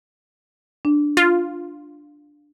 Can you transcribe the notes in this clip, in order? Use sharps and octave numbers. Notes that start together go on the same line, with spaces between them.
D4
F4